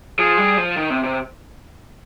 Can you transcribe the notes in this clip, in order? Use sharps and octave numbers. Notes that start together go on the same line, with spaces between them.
F3 G#4
G3
F3
D#3
C3
C3